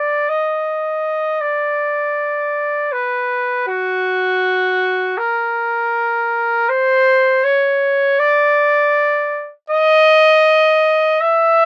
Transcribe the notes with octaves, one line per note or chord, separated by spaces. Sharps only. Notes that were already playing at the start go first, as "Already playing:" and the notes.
Already playing: D5
D#5
D5
B4
F#4
A#4
C5
C#5
D5
D#5
E5